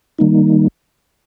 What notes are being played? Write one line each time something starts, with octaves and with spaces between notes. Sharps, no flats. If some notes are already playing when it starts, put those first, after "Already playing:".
D#3 G3 A#3 D#4